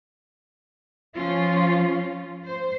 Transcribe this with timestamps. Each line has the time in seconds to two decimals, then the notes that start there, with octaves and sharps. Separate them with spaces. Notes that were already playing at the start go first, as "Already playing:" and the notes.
1.15 F3 C#4 F4
2.45 C5